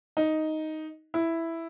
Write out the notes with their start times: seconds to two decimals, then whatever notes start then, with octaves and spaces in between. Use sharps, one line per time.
0.17 D#4
1.14 E4